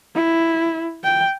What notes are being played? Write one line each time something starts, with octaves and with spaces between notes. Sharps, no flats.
E4
G5